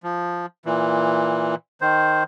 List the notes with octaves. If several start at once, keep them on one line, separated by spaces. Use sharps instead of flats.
F3
A#2 E3
D#3 C5